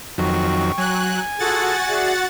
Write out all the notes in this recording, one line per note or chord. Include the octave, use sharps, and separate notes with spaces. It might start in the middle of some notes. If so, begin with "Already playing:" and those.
F2 D#3 F#3 G5 C#6
F#3 G#5 F#6
F4 F#4 G#4 A4 F#5 A6
G#4 D5 E5